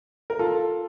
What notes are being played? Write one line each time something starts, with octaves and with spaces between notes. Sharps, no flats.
A#4
F4 A4